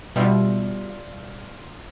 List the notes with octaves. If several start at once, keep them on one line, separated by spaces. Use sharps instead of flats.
B2 G3 D4 F4 E5